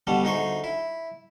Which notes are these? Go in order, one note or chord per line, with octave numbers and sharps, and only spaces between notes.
B2 D3 G3 A4
D2 D#4 G#4 C5 C#6
E4